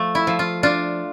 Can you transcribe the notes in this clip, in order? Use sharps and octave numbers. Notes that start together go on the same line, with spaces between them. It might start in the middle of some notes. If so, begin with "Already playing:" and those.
Already playing: F3 A3
E4
F3
F4
D4 F4